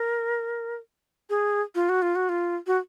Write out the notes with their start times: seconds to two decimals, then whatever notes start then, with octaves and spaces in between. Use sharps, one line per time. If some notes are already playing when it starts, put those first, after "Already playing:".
Already playing: A#4
1.30 G#4
1.75 F4
1.89 F#4
2.02 F4
2.15 F#4
2.29 F4
2.67 F#4